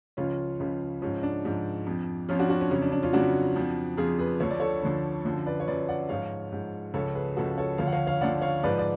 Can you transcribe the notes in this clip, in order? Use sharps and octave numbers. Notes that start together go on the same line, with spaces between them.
C#2 C#3 F3 C#4 F4
C#2 C#3 F3
G#2 F3 C#4
D4
G#2 F3
F2 F3
F2 F3 C#4 F4
D4 F#4
D4 F#4
C#4
F2 C#3 F#3 C#4
D4
D4
C#4 F4
F2 C#3 F#3 D4 F#4
F2 F3
F2 F3 F4 G#4
G#4 B4
D2 D3 F3 C#5
D5
A4 C#5
D2 D3 F3
F#2 D3 F3
B4 D5
C#5
F#2 D3 F3 B4 D5
D5 F#5
G#2 F3 C#5 F5
G#2 F3
C#2 C#3 F3 A4 C#5
G#4 B4
C#2 C#3 F3 F#4 A4
A4 C#5
D2 D3 F3 C#5 F5
F#5
C#5 F5
C#5 F5
D2 D3 F3 D5 F#5
C#5 F5
G#2 F3 B4 D5
D5